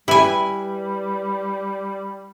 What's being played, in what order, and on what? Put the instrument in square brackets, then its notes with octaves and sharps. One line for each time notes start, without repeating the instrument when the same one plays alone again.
[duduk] G3 [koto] E4 G#5 [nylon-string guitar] G4 B4